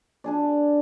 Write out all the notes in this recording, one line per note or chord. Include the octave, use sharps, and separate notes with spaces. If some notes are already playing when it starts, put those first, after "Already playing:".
D4 G#4 D5